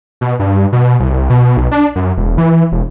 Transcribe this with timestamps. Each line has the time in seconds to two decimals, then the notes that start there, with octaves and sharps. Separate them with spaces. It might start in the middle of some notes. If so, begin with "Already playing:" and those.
0.21 B2
0.39 G2
0.72 B2
1.00 C2
1.30 B2
1.57 B1
1.72 D4
1.95 F#2
2.17 E1
2.38 E3
2.72 E1